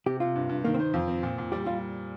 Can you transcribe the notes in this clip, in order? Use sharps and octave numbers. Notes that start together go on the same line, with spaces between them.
C3 G4
C3 F4
G2
G2
D#3 A#3
C4
D#4 C5
F2 F4
C4
A#2
A#2
G3 G4
G3 F4